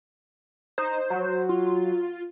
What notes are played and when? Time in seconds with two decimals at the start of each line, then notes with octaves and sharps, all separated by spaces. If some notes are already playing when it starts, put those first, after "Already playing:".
0.78 D#4 C5
1.10 F#3
1.49 F4